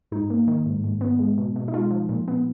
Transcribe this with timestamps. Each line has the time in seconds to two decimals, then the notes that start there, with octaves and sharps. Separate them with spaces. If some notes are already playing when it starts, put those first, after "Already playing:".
0.11 G#2 D#4
0.30 A#3
0.47 D#3
0.66 G#2
0.84 G#2
1.01 B3
1.19 G#3
1.38 B2
1.56 B2
1.68 D#4
1.74 G#3 F4
1.91 F3
2.09 A#2
2.28 B3